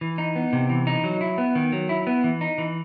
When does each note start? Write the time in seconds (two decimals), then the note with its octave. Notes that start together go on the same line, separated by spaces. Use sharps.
0.01 E3
0.18 D#4
0.36 B3
0.53 C3
0.70 E3
0.87 D#4
1.04 F#3
1.21 E4
1.38 B3
1.55 D#3
1.73 F#3
1.89 E4
2.07 B3
2.24 E3
2.41 D#4
2.58 E3